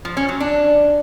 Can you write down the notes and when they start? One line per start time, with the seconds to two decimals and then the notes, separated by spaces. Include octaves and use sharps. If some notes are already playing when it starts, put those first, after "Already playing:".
0.05 F3
0.17 C#4
0.29 F#3
0.40 D4